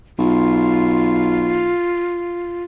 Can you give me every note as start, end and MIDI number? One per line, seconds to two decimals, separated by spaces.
0.19 1.77 35
0.19 2.64 65